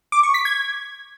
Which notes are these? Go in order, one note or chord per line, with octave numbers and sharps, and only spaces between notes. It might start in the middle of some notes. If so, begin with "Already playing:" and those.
D6
C#6
B6
G#6